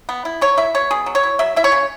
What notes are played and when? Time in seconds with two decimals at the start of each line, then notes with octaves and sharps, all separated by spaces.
0.09 B3
0.25 E4
0.41 F#3 C#5
0.57 E4 E5
0.75 B2 C#5
0.91 B2 G#4
1.06 F#3
1.15 C#5
1.23 E4
1.39 F#3 E5
1.56 E4 E5
1.64 C#5
1.72 C#3